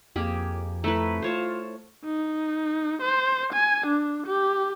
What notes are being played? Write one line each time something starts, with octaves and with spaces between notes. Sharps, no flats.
F2 A#3 G4 G#4
A3 E4 B4 A#5
F4 C5 C#5 A5
D#4
C5
G#5
D4
G4